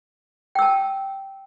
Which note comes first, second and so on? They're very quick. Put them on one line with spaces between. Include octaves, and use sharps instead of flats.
G5 E6 A5